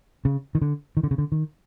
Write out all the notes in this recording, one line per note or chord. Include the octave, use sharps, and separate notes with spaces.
C#3
D#3
D3
D#3
D3
C#3
D3
D#3